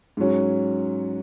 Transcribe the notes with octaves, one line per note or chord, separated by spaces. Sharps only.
G#2 F#3 C#4